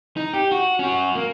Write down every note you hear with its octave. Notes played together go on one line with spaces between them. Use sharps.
D#4
G4
F#4
C#4 F#4
A#3